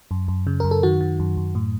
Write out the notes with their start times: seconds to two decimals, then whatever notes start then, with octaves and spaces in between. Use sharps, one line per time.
0.11 F#2
0.28 F#2
0.47 C#3
0.60 F#2 A#4
0.71 A4
0.83 D#3 F#4
1.01 D#3
1.20 F#2
1.37 F#2
1.55 A2